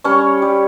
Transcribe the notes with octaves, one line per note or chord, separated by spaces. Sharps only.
G3 C#4 C#5
G3